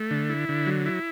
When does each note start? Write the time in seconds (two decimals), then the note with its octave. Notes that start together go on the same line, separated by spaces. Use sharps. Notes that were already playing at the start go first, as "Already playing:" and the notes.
Already playing: A3
0.11 D3
0.29 E4
0.49 D3
0.67 F#3
0.86 E4